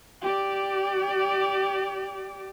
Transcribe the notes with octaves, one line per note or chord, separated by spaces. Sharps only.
G4 D5